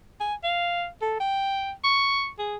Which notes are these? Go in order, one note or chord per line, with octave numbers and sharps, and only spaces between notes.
G#5
F5
A4
G5
C#6
G#4